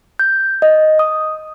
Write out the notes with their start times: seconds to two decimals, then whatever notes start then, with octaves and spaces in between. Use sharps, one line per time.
0.19 G6
0.62 D#5
0.99 D#6